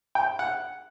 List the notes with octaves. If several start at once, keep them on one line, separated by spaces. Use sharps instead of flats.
G5
F#5